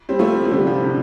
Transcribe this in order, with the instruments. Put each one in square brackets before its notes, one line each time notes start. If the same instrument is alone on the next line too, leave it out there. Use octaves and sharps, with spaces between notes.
[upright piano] G3 C4
F3 A3
A3
D3 G3
C3 F3
A2 D3